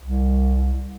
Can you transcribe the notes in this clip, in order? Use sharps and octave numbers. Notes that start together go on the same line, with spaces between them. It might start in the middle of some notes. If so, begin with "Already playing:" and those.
C2